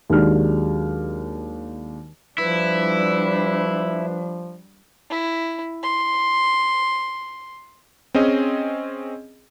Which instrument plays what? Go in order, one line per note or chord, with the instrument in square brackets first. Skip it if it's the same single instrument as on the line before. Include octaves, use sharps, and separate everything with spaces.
[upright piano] D#2 F#3 G#3 D4 G4 F6
[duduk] F3 [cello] G3 D4 [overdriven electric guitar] E4 [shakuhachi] B4
[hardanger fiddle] E4
C6
[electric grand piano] C4 C#4 G#4 D#5